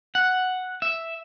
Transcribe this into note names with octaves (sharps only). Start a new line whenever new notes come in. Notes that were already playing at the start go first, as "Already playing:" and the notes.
F#5
E5